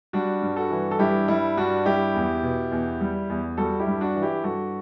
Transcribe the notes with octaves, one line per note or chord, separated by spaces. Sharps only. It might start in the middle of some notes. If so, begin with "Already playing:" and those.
G3 D4 F#4
G2
F#4 A4
E3
A4
G2 E4 G4
G3 E4
G2 D4 F#4
G3 E4 G4
E2
B2
E2
G3
E2
G3 F#4 A4
E4 G4
G2
D4 F#4
E3
E4 G4
G2 F#4 A4